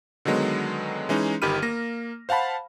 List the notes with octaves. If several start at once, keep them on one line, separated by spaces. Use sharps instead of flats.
D3 D#3 F#3 G#3 B3
E3 G#3 C#4 D#4
G1 D#3 G4 B5 F6 D#7
A#3 A#6
C5 F5 F#5 A5 B5